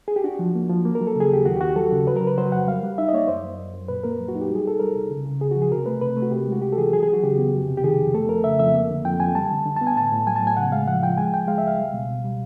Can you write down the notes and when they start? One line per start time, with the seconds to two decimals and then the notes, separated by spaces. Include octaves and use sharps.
0.08 G#4
0.16 G4
0.24 D4 F#4
0.39 F3
0.55 A#3
0.70 F3
0.85 A#3
0.95 A#4
1.01 F#3
1.07 A4
1.16 C#3 G#4
1.30 D#2 G4
1.46 D#2 F#4
1.57 G4
1.61 D#2 F#4
1.76 F#3 A4
1.92 C#3
2.07 F#3 B4
2.16 A#4
2.21 C#3
2.27 B4
2.38 F#3 C5
2.52 F2 F#5
2.67 G3 F5
2.83 G3
2.98 D#4 E5
3.09 D#5
3.13 A#3 C#5
3.18 D5
3.28 F#2 C5
3.44 F#2
3.59 F#2
3.74 F#2
3.88 A#2 B4
4.04 A#3 A#4
4.20 F#3
4.28 F#4
4.35 D#4
4.41 G4
4.50 G3
4.55 G#4
4.65 C2 A4
4.80 G3 A#4
4.95 C2
5.11 C#3
5.25 C#3
5.40 C#3 G#4
5.51 F#4
5.56 F3
5.62 G#4
5.71 C3 A#4
5.86 A3 B4
6.01 C3 B4
6.17 A3
6.22 F#4
6.31 C3 G4
6.47 G#3 F#4
6.62 C#2 G4
6.73 A4
6.77 E3 G#4
6.92 F#3 G#4
7.03 G#4
7.07 F#3
7.13 F#4
7.24 C#3 G4
7.39 B3
7.53 F2
7.68 C3
7.77 G4
7.83 D#3 G#4
7.99 F2
8.14 A3 A4
8.29 F2 A#4
8.44 C#3 E5
8.59 F2 E5
8.74 A#3
8.91 D3
9.05 F2 G5
9.20 F2 G#5
9.35 G3 A5
9.51 D3
9.66 D3
9.76 B3 A5
9.87 G#5
9.96 A2 A5
10.12 A2
10.27 F#3 G#5
10.36 A5
10.42 A2 G#5
10.57 C#3 F#5
10.72 G#3 F5
10.87 F3 F#5
11.02 F3 G5
11.18 G#3 G#5
11.33 C#2 G5
11.48 G#3 F5
11.58 E5
11.63 C#2 F5
11.78 G3
11.93 B2
12.09 B2
12.24 G3